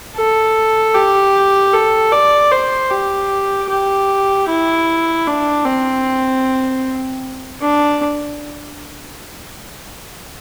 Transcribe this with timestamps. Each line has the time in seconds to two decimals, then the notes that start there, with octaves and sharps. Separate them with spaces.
0.16 A4
0.95 G4
1.73 A4
2.12 D5
2.52 C5
2.91 G4
3.69 G4
4.49 E4
5.27 D4
5.66 C4
7.62 D4